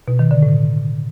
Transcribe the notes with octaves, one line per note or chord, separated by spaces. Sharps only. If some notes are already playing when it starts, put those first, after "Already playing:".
B2
D#3
D3
A2